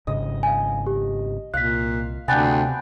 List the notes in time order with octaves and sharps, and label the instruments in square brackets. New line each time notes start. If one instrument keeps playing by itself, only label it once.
[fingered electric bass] G#1 G#2 C#3 [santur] D#5
[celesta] F5 G#5
G4
[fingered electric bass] C2 [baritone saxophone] A#2 [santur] F5 [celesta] F#6 B6
[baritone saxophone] D2 [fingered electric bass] C3 [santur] B3 D4 G5 [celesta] F5 G#5 A6